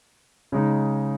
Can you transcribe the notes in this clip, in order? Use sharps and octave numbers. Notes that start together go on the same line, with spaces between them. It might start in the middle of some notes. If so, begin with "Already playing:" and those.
C#3 G#3 D#4